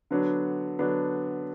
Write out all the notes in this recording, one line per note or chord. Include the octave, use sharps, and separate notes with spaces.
D3 F#3 B3 D4
D3 F#3 B3 D4